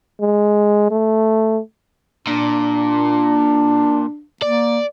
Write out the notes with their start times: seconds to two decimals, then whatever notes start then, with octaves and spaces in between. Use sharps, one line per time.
0.21 G#3
0.91 A3
2.27 A#2 D4
4.42 A#3 D5